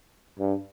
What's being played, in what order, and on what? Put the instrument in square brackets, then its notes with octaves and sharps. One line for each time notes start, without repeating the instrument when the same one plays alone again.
[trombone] G2